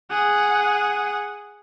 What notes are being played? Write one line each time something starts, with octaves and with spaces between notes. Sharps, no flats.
G#4 F#5